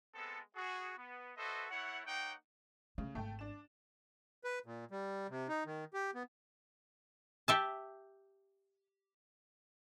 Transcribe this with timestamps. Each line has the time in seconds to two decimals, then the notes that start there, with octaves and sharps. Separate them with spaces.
0.15 G#3 B3 C4 A4
0.56 F#4 G#4
0.98 B3
1.37 F#4 A4 B4 C5 D#5 E5
1.71 A3 E4 C#5 F#5
2.07 A#3 D#4 C#5 F#5 G5
2.98 C#3 A3
3.15 G#1 A3 G5 A5
3.39 D4 E7
4.44 B4
4.66 A#2
4.91 G3
5.30 C3
5.48 D#4
5.66 D#3
5.94 G4
6.15 B3
7.48 G4 E5 A5